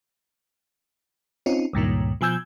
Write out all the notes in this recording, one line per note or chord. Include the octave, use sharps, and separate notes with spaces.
C4 C#4 D#4 F4
C#2 G2 A#2 D#3
B2 F3 G#5 E6 G6 G#6